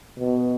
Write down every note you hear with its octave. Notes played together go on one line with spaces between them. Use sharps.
B2